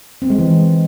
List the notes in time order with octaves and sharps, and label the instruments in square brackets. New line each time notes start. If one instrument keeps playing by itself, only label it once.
[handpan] C4
G#3
E3